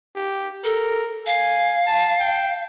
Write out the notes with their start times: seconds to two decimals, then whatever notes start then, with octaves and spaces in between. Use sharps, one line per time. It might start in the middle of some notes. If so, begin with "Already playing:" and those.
0.15 G4
0.64 A4 A#4
1.26 F5 G#5
1.86 A5
2.20 G5